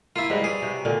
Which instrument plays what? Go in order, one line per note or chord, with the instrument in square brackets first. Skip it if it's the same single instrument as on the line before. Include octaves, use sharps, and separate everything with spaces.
[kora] A#3 [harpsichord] E4 F4
[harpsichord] G#2 [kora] G3 B4 D#5
[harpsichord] G#4 [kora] C#5 D5
[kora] C3 F#4
A#2 D3 D5